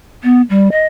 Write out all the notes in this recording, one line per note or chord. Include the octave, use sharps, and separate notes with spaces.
B3
G3
D#5